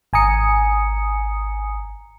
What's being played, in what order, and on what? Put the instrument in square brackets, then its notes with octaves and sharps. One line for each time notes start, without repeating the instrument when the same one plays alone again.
[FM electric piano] G#1 G#5 A#5 D#6 C#7